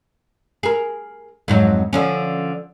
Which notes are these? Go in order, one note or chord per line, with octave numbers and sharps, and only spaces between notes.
G#4 A#4
F2 G#2 F#3
D3 F3 C#4